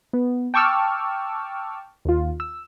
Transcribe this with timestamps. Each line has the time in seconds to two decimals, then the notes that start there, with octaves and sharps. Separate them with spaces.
0.13 B3
0.54 G5 A5 C#6 D6 E6 F6
2.05 D#2 F4
2.40 E6